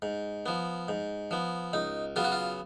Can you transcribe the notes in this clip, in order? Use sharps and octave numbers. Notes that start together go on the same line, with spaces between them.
G#2
F3 B3
G#2
F3 B3
C#2 D#4
C#3 F#3 B3 F4
F#4
F4